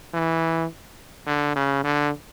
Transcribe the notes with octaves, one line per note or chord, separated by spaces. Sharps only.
E3
D3
C#3
D3